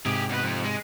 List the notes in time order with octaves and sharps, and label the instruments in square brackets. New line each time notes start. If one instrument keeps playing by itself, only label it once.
[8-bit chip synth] G#2 C3 [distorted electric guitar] G4 G#4
[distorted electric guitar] B2 B4
F2
G#3